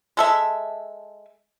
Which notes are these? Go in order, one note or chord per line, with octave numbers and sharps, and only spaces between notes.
G#3 A4 E5